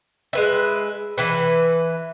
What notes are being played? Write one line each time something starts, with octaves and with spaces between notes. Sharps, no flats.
G#3 B4 E5
E3 E4 B4